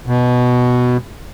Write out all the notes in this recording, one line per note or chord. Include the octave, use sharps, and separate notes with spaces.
B2